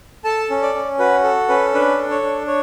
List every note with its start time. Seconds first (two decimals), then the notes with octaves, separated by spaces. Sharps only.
0.24 A4 A5
0.50 C#4
0.63 D5
0.74 C#4
0.99 F#4 B4
1.23 A4
1.49 C#4 B4
1.73 D4 B4
1.99 A4
2.11 C#5
2.23 D4
2.47 C#5